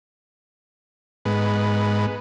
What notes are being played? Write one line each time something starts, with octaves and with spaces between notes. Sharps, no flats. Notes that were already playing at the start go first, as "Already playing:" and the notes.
G#2 B3